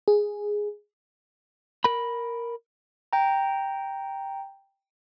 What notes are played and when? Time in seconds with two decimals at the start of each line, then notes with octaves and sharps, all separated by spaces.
0.08 G#4
1.84 A#4 B5
3.13 G5 A#5